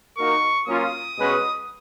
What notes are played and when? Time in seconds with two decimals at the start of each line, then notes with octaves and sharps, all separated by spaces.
0.17 A#3 D#4 F#4 A#4 C#6
0.68 F#3 A#3 C#4 F4 D#6
1.18 B2 G#3 C#4 F#4 B4